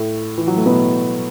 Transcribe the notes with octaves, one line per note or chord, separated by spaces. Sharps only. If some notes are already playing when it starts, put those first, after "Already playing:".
Already playing: A2 A3
E3
F#3
A3
B2 B3